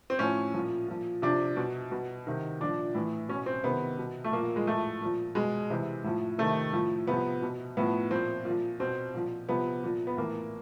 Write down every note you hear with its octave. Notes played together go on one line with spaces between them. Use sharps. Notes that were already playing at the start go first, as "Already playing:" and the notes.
C4
A2 F3 C#4
A#2 F3
A#2 F3
C3 F3 D4
B2
B2
C3 D#3
A#2 F3 D4
A2 E3
B2 C#4
C4
C3 D#3 B3
B2
A3
A#2 F3 A#3
G#3
A2 F3 A3
A#2 F3
B2 G#3
C3 E3
A2 F3
C3 D#3 A3
A2 F3
C3 F3 B3
B2
A2 F3 B3
A#2 F3 C4
A#2
F3
B2 C4
A#2 F3
C3 F3 B3
A#2 F3
B3
A2 E3 A#3